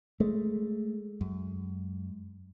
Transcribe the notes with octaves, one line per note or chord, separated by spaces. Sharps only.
G#3 A3
F#2